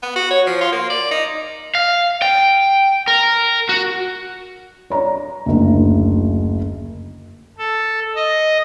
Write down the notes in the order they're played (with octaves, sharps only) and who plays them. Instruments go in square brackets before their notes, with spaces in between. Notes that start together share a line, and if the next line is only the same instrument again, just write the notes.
[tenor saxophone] B3
F#4
C#5
F3
F4
A#3
D5
D#4
[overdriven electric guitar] F5
G5
A#4
F#4
[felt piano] C#5 D5 A#5
F#1 D2
[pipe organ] A4
D#5